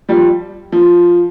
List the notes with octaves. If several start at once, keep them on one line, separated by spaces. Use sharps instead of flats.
F3 G3
F3